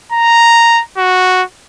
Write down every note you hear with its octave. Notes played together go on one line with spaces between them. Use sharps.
A#5
F#4